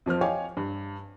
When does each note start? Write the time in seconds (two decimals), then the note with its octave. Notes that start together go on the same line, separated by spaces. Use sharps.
0.06 F2 F3 C4 F6
0.21 C#5 D#5 F5 G5 G#5 D6
0.57 G2